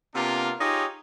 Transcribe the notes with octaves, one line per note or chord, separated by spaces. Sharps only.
C3 A#3 B3 D4 F4
D#4 F4 G4 G#4 C#5